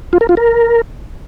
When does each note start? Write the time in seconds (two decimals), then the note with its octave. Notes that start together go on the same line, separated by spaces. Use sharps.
0.13 F4
0.21 A#4
0.29 F4
0.37 A#4